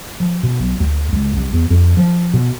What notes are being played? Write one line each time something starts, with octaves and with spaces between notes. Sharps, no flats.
F3
B2
B1
D2
C#2
C2
E2
F2
F3
B2